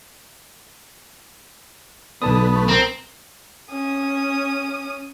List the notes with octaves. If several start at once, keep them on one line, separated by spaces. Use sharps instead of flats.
B1 D3 B3 A5 D#6
A3
C4 A#4
C#4 D#6